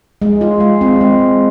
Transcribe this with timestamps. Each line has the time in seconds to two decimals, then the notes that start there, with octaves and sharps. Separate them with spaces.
0.22 G#3
0.41 F4
0.60 G#3
0.81 C4
1.01 G#3